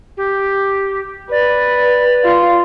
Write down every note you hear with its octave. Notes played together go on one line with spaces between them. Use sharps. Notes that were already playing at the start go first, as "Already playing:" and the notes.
G4
B4 D5
F4